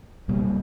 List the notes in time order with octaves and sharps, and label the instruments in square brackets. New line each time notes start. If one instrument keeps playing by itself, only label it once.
[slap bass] C#2 B2 G3 A#3